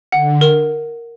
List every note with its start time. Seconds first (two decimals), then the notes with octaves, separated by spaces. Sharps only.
0.12 D3 F#5
0.41 A#4